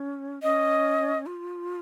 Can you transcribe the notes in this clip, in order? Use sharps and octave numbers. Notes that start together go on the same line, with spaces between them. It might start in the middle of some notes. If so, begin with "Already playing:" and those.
Already playing: C#4
C#4 D#5
F4